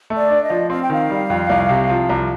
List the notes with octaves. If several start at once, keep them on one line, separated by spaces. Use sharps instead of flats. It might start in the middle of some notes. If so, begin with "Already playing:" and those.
A3
D5
D4
D#5
F3
C4 F5
G5
D#3 F5
G3
F2
C2
C3
F3
C2